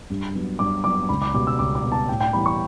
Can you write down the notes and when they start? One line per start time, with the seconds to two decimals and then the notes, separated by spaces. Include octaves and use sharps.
0.10 G2
0.35 F#3 B3
0.59 G2 D6
0.84 F#3 B3 D6
1.09 C#2 B5
1.22 D6
1.34 B2 G3 B3 D6
1.47 E6
1.59 C#2 D6
1.75 D6
1.84 B2 G3 B3
1.92 A5
2.09 A2 G5
2.21 G5
2.33 E3 G3 B3 B5
2.46 C#6